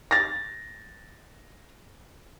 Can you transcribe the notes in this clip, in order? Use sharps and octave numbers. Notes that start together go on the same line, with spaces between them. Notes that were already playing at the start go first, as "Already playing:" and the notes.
A6 A#6